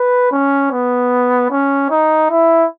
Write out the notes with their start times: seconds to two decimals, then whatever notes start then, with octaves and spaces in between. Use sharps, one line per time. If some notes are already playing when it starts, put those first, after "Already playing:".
Already playing: B4
0.32 C#4
0.71 B3
1.51 C#4
1.90 D#4
2.30 E4